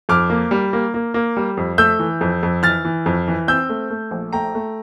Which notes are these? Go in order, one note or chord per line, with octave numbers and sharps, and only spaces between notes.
F2 D6 F6
A#3
G3
A#3
A#3
A#3
G3
F2
A3 E6 G6
E3
F2
F2
E3 F6 A6
E3
F2
E3
C4 E6 G6
A3
A3
A#1
A3 G5 A#5
A3